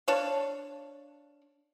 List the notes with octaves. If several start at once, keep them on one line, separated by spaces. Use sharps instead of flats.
D4 C#5 F5